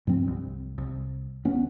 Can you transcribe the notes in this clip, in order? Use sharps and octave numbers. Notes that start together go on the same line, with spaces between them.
G2 F3 C4
C2
C2
D2 B3 C#4